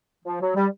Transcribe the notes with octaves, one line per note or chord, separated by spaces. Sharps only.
F3
F#3
G3